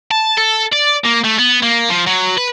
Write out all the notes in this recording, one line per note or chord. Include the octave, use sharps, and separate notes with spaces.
A5
A4
D5
A#3
A3
B3
A#3
F3
F#3
B4